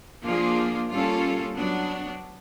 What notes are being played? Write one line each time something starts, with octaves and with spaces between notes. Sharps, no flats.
F3 A#3 D4 F4 G#4
G3 A#3 C#4 F4 A4
F#3 B3 D4